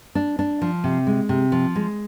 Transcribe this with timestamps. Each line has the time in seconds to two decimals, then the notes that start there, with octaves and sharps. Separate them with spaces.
0.15 D4
0.39 D4
0.62 F3
0.84 C3
1.07 G#3
1.29 C3
1.52 F3
1.75 G#3